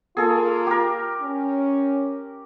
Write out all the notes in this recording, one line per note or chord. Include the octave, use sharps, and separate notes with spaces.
A#3 F4 G#4 A4
G4 A#4
C#4